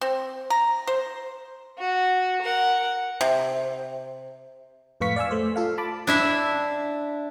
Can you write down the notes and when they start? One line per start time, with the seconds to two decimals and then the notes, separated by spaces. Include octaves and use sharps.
0.01 C4
0.50 A#5
0.87 C5
1.78 F#4
2.42 A#4 F#5
3.21 C3
5.01 F2 A2 B4 F5 C#6 B6
5.16 D5 F5 G#5 E6
5.31 A3 C5
5.56 F4 A4 F5
5.78 A5 B5 D6
6.07 D4 E4 E5